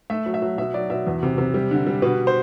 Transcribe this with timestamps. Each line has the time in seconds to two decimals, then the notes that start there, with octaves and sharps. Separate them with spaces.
0.10 A3 E5
0.26 F#3
0.34 E5
0.42 F#3
0.58 B2 E5
0.74 F#3 D5
0.90 B2 E5
1.07 E2
1.23 C3
1.38 C3
1.54 G3
1.71 D3
1.87 G3
2.02 B2 B4
2.27 C5